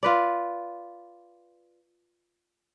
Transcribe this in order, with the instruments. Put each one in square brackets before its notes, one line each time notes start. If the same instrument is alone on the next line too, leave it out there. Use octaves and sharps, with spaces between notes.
[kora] F4 B4 D5